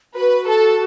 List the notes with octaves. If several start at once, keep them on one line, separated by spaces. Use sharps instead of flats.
F#4 B4
A4